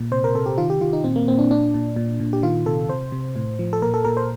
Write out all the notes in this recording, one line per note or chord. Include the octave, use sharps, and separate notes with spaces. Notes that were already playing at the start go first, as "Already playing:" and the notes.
Already playing: A#2
C3 C5
A#4
C3 A4
G4
D#3 F4
G4
D#3 F4
D#4
A#2 C4
A#3
A#2 C4
D4
A#2 D4
A#2
A#2
A#2
G4
D#3 F4
C3 A4
C3 C5
C3
A2
F3
A4
A#2 A#4
A4
A#2 A#4
C5